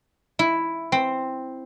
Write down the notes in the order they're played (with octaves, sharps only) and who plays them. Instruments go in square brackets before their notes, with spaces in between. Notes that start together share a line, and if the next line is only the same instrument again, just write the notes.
[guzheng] E4
C4